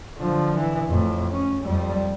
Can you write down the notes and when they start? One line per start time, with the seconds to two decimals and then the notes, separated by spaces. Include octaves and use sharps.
0.17 D3 F3
0.56 E3
0.88 F2 A2
1.31 C#4
1.62 F2 G3